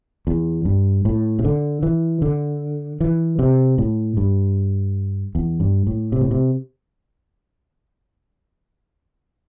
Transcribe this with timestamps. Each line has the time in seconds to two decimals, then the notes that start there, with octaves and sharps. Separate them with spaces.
0.27 E2
0.65 G2
1.05 A2
1.39 C3
1.44 D3
1.83 E3
2.22 D3
3.00 E3
3.39 C3
3.78 A2
4.17 G2
5.35 E2
5.60 G2
5.87 A2
6.12 C3
6.21 A2
6.31 C3